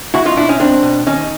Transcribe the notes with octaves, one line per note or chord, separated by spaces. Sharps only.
C#2 E4 F#4
D#4 F4
B2 D4 E4
C#4 D#4
C#2 C4 D4
B2
D#2 C#4 D#4